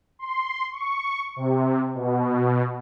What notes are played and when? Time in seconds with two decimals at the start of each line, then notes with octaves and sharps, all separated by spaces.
0.19 C6
0.72 C#6
1.36 C3
1.95 B2